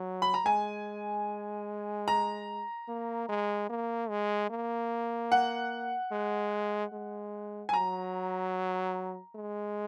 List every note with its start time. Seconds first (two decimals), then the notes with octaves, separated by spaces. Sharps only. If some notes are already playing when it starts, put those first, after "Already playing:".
Already playing: F#3
0.22 B5
0.34 A#5
0.46 G#3 G#5
2.08 A#5
2.88 A#3
3.29 G#3
3.70 A#3
4.09 G#3
4.50 A#3
5.32 F#5
6.12 G#3
6.93 G#3
7.69 G#5
7.73 F#3 A#5
9.35 G#3